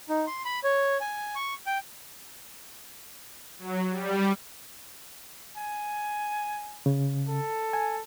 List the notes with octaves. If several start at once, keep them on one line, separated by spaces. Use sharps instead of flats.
D#4
C6
B5
C#5
G#5
C#6
G5
F#3
G3
G#5
C#3
A4
G#5